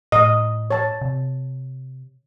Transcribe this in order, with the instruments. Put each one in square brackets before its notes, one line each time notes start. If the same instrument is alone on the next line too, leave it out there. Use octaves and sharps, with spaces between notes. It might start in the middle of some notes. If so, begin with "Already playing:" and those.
[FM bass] A2 [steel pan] D#5
[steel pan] C#5 A5
[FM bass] C3